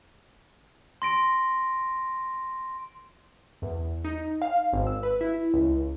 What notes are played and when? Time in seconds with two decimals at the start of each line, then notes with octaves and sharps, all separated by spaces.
1.02 C6 A#6 D7
3.62 E2
4.05 D#4
4.42 F5
4.73 G#1
4.87 E6
5.03 B4
5.21 E4
5.54 C#2